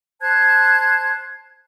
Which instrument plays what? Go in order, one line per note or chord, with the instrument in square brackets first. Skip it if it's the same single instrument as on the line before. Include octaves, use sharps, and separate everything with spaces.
[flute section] C5 A5 F#6 G#6